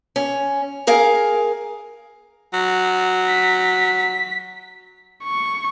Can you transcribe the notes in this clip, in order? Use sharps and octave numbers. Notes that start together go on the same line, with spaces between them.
C#4
G#4 A#4 F5 G#5
F#3
B6
C#6